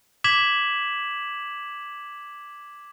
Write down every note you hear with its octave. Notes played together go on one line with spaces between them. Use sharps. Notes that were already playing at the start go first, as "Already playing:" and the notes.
D6 G#6 B6 E7 F#7